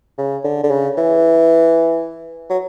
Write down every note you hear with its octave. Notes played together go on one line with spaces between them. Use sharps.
C#3
D3
D3
C#3
E3
F#3